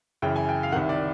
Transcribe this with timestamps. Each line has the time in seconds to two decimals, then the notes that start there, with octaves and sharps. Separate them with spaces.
0.22 F#2 C#3 E3 G5
0.36 G#5
0.49 G5
0.63 F5
0.72 C2 C3 D#3 F#5
0.89 D5